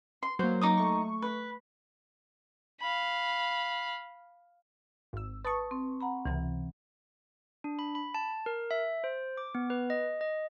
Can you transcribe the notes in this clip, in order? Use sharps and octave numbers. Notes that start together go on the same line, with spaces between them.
C6
F#3 A#3 C5
D#4 D6 D#6
A3 C#6
B4
F5 B5
G#1 E6
B4 A5 C#6 D#6 A6
C4
F#5 A#5 B5
C#2 C3 E3
D4
B5
B5
A5
A#4
E5
C5
D6
B3
B4
D#5
D#5